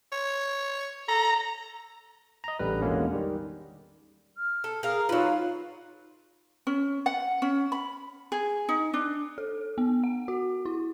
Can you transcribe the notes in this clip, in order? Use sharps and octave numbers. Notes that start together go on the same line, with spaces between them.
C#5
A4 A#5
D#5 A#5
A1 D3 G3 B4
E2 B2 D3 G#3 A#3 C#4
D#3 G3
F6
A4
G#4 A#4 F5
F#3 D#4 F4 B4 F5
C#4
F#5
C#4
B5
G#4
D#4
D4
A4
B3
F#5
F#4
E4